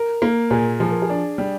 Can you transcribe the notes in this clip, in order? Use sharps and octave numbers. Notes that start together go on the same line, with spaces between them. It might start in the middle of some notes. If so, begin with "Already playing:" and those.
Already playing: A#4
A#3
A#2 G#4
F3 G#4
A#4
G#4
D4
G3